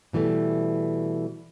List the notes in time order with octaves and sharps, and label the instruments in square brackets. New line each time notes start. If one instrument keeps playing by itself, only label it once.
[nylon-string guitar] B2 E3 G3 A3